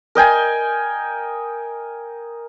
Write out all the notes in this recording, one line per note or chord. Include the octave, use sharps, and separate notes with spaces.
A#4 D#5 G5 G#5